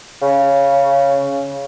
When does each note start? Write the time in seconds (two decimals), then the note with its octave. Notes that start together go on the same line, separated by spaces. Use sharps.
0.22 C#3